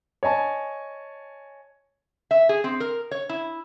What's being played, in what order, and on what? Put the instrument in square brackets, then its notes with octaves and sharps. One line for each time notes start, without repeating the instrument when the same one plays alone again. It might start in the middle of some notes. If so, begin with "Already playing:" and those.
[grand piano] C#5 D#5 G#5 A5
[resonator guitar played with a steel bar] E5
G#4
C4
A#4
C#5
E4